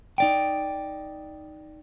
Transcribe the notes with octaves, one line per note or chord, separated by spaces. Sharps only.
D#4 D5 G5